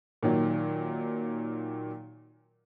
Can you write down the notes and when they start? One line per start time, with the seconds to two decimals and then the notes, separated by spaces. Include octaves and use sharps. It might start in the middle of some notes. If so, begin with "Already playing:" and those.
0.23 A#2 D#3 F#3